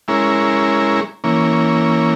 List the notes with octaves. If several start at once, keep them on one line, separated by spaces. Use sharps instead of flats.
G#3 C#4 E4 A#4
E3 A#3 C#4